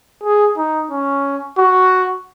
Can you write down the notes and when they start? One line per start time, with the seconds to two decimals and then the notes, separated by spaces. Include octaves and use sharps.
0.24 G#4
0.57 D#4
0.91 C#4
1.58 F#4